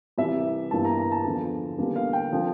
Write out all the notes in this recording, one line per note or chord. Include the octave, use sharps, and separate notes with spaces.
C2 C3 E3 E5
G1 G2 E3 A#3 A5
A#5
A#5
A5
E2 D3 F3
E2 D3 G3 A#3
F5
G5
D3 F3 C4